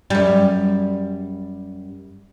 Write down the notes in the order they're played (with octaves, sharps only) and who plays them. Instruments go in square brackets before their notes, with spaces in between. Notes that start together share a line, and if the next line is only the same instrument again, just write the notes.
[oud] F#2 G3